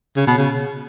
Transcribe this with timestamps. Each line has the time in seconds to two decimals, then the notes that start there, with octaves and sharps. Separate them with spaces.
0.17 C#3
0.27 B2
0.38 C#3